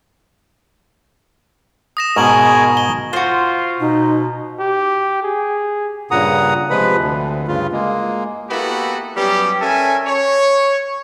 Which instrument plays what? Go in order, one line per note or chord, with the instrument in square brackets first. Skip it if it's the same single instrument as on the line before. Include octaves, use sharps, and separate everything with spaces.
[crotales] D#6 A#6 E7
[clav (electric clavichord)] G#2 B2 [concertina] G#4 A#4 [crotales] C#6 F#7
[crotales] G7
[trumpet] F4 [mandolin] F#4 C5
[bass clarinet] B2 [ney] D#4
[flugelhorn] G4
G#4
[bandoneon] G2 A#2 C#3 F#5 A#5 D#6
C3 F3 G#3 B4 B5
D2
G2 C#3 F4
G#3 A#3
[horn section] A#3 B3 E4 F#4 G4 A4
F#3 G3 B3 C#4 G4
C#4 A4 A#4 E5 G#5
C#5